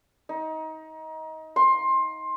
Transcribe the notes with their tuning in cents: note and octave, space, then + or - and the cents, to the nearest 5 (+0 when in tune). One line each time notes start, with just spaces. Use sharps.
D#4 +25
C6 +20